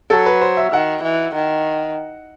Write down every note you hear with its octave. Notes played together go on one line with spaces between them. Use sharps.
F#3 A4
B4
C5
E5
D#3 F#5
E3
D#3